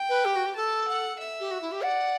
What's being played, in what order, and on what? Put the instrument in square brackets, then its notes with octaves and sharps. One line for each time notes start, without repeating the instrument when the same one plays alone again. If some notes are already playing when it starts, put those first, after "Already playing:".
Already playing: [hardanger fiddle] G5
[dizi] B4
G4
F#4
G4
[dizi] A4 [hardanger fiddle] A5
[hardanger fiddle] F#5
E5
[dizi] G4
F#4
E4
G4
[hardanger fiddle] D5 [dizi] F#5